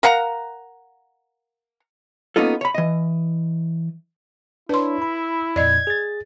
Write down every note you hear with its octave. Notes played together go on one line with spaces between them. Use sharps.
A#4 F5 F#5 A#5
A#3 B3 C#4 D#4 F4 A4
C#5 B5
E3 D#5
D4 E4 B4 C#5 C6
B5
F2 A#2 D5 D#5 G#6
G#4 A6